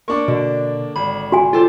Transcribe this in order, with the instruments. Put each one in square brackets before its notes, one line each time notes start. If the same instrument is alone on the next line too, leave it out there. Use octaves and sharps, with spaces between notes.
[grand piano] A#3 D4 D6 [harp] C#6
[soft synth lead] B2 [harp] D3
[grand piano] G#1 [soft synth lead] B5
[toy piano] F#4 G#5
[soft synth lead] F4 [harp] G4 A4 C5